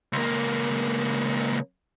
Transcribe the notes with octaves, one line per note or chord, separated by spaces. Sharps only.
C#2 A#3